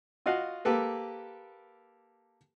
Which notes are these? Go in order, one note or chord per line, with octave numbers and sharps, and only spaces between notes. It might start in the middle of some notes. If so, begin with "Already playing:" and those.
F4 F#4 D#5 F5 F#5
A#3 G4 A4 B4